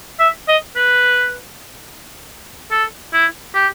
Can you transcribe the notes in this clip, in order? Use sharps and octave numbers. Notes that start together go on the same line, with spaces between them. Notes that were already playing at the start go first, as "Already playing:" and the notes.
E5
D#5
B4
A4
E4
G4